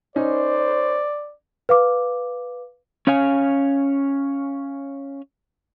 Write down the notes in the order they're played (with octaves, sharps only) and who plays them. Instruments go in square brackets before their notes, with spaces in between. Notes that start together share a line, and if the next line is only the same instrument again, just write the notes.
[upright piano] C#4 D#4 [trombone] C5 [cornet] D5
[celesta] B4 F5 D6
[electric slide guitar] C#4 C#5 F5 G#5